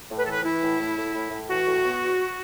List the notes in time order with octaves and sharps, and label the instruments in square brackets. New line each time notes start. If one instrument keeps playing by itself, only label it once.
[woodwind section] A2
B4
E3 A4
B4
E3 E4
A2
A2
A2
A2
A2
E3 F#4
A2
B3
E2